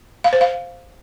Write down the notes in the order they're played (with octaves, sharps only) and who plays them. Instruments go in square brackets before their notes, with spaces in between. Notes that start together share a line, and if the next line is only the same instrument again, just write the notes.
[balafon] F5
C5
F5